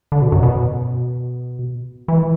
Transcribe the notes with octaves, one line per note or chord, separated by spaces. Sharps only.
D3
B2
F#2
B2
E3